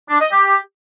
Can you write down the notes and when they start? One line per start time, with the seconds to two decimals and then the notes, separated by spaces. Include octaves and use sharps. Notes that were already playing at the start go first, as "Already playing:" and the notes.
0.09 D4
0.21 D#5
0.32 G4